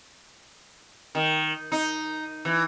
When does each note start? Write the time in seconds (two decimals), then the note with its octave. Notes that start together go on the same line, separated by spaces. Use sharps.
1.15 D#3
1.72 D#4
2.45 E3